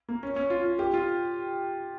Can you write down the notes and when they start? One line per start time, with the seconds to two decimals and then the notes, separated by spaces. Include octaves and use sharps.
0.09 A#3
0.23 C#4
0.36 C#4
0.50 F4
0.65 F4
0.79 G4
0.94 F4